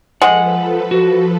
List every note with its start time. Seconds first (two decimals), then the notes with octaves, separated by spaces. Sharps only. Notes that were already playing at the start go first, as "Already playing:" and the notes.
0.22 F3 G#3 A4 B4 F#5
0.91 F#4